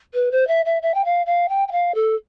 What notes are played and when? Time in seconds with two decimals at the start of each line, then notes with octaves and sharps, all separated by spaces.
0.14 B4
0.32 C5
0.47 E5
0.65 E5
0.82 E5
0.94 G5
1.05 F5
1.26 F5
1.49 G5
1.68 G5
1.72 F5
1.95 A4